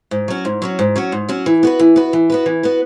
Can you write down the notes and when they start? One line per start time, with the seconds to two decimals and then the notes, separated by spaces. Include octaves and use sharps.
0.11 G#2
0.28 F#3 C#4 F#4
0.45 G#2
0.62 F#3 C#4 F#4
0.79 G#2
0.96 F#3 C#4 F#4
1.12 G#2
1.29 F#3 C#4 F#4
1.46 E3
1.63 B3 F#4 B4
1.79 E3
1.96 B3 F#4 B4
2.13 E3
2.30 B3 F#4 B4
2.46 E3
2.63 B3 F#4 B4